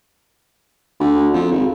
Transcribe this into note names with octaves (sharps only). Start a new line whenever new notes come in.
D2
F2
G#1